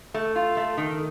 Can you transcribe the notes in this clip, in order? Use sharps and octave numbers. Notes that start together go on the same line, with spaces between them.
A3
F4
A3
D#3